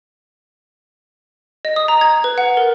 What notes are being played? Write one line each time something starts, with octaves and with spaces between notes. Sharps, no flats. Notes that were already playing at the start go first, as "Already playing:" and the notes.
D#5
D#6
A#5
G#6
B4
F#5
A#4